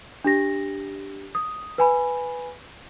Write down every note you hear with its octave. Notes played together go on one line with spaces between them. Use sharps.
D4 G4 A#6
D#6
B4 G#5 B5